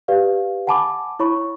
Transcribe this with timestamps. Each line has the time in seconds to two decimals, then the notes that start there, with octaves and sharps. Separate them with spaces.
0.08 G4 B4 D5 F5
0.67 F#5 G#5 A5 B5 D6
1.19 E4 C#5 B5 C#6